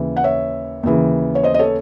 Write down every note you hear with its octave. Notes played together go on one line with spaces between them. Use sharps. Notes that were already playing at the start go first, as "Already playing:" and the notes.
Already playing: D#2 C#3 E3
F#5
C#5 E5
D#2 C#3 E3
C#5
C5 D#5
D#5
A4 C#5